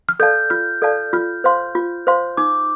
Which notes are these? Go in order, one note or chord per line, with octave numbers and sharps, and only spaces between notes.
F6
A4 D5 F5 A5 G6
F4 F6
A4 D5 F5 A5
F4 F6
C5 F5 C6
F4
C5 F5 C6
D#4 D6